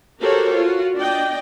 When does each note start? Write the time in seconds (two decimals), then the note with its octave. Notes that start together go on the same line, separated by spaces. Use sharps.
0.20 F#4 G4 A4 A#4 C5 C#5
0.57 F4 F#4
0.95 D4 D5 D#5 G5